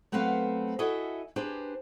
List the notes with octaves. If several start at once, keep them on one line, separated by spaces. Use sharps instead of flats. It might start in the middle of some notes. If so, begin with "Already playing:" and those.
F#3 A3 B3 C4 B4 F5
E4 F#4 A4 D#5 E5 G#5
D4 G4 G#4 B4 C5